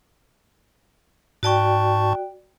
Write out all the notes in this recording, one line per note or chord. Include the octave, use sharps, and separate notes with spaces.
G#2 F#4 D5 G5 A5 C#6